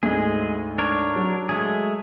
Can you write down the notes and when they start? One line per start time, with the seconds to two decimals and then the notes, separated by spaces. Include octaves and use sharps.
0.03 D2 G#2 G#3 G#4
0.78 D4 A#4 C#5
1.16 F#3
1.49 G#3 A3 G#4